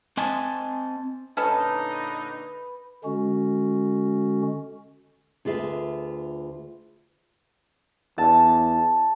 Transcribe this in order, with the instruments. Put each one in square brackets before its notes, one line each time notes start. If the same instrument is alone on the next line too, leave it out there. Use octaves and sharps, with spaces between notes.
[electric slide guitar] C4 D#5 G#5 A5
[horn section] A#2 D3 D#4 [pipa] C#4 A4 D#5 [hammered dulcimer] B4
[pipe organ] D3 G#3 C#4 F#4
[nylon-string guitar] D2 F4 G#4 B4 E5
[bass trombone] E2 [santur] A5